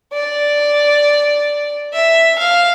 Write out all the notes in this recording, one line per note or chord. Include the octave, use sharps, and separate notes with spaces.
D5
E5
F5